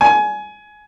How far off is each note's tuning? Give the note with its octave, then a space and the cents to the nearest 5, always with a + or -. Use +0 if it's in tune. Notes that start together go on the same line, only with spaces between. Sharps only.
G#5 +20